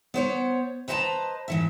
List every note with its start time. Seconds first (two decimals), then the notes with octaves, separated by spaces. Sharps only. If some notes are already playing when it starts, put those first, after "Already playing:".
0.14 B3 C5 C#5
0.88 B4 C5 D#5 G5 A5 A#5
1.48 G#2 E3 E5